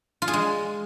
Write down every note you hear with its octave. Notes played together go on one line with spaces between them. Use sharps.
F4
G#4
G#3